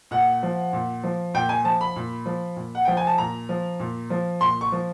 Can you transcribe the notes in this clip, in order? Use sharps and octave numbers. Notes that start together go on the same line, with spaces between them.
A#2 F#5
F3
A#2
F3
A#2 G5
G#5
F3 A5
B5
A#2
F3
A#2
F#5
F3 G5
G#5
A5
A#2 A#5
F3
A#2
F3
A#2 C6
C#6
F3